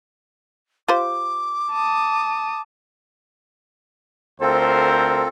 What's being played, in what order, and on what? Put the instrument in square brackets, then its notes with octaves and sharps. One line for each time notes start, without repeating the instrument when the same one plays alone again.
[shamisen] F4 G4 C5 [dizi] D6
[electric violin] A5 D#6
[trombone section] D2 A#4 C5 [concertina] C4 F4 A4